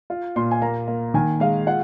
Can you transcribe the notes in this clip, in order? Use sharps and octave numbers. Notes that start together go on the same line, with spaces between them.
F4
A#2 C6
G#5
A#3 A#5
A#3
D#3 G#5
G#3 F5
F4 F#5